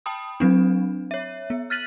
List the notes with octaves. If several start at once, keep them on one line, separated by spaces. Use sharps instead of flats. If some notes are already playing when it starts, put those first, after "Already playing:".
G5 A5 B5 D#6
F#3 C4 D4
C#5 E5
B3
F6 F#6 A6 B6 D#7 F#7